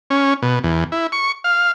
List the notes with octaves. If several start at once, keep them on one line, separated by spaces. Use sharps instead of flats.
C#4
B2
E2
E4
C#6
F5